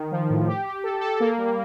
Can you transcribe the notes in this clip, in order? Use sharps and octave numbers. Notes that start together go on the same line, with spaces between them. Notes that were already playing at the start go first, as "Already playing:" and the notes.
Already playing: D#3
F3
A2
G4
G4
A4
A4
A#3
G3